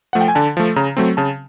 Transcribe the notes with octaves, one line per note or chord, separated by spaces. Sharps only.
F3 A3 F#5
G5
G#5
D3 A5
F3 A3
C#3 A#5
F#3 A3 C4
C#3 A5